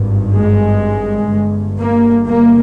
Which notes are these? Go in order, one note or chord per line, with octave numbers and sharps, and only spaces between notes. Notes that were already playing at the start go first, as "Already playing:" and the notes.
Already playing: G#1 G2
G#3
G1 G2
A#3
A#3